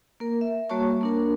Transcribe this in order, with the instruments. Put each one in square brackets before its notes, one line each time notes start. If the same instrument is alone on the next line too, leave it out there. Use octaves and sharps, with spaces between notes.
[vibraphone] A#3 A#4
E5
G3 A#3 F#4 C#5 A5 C#6
A#3 D4 A#4